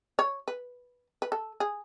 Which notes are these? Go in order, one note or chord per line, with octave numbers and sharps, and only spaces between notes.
C#5
B4
B4
A4
G#4